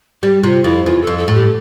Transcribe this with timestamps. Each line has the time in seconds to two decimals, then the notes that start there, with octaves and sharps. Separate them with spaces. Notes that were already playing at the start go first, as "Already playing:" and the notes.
0.23 G3 G4
0.43 C3 F4
0.64 F2 E4
0.86 E2 F4
1.01 A4
1.07 F2
1.18 A4
1.28 A2
1.34 G4